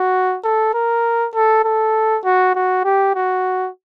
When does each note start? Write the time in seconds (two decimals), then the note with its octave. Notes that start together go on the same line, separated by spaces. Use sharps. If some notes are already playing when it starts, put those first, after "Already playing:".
Already playing: F#4
0.44 A4
0.74 A#4
1.35 A4
1.65 A4
2.25 F#4
2.55 F#4
2.85 G4
3.15 F#4